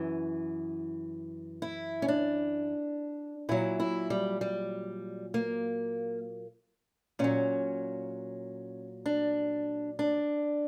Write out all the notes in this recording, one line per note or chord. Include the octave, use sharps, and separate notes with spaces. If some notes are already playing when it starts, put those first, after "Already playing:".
Already playing: F#2 E3
E4
C#4
D4
A#2 F#3 E4
E4
G3
G3
A#3
A#2 F#3 C#4
D4
D4